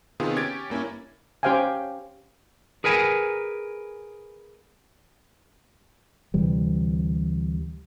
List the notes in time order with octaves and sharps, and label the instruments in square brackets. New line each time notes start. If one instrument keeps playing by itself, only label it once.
[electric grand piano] C3 D#3 B3 F4 G#4
C#4 G4 G#6 A6 D7
G2 A#3 C#4 E4
[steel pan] C#4 G4 C5 F5 G5 G#5
[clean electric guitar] G#4 A#4 B4 G#5
[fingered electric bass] D2 C3 E3 G3